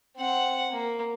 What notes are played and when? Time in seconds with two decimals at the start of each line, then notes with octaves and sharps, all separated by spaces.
0.17 C4 F#5
0.72 A#3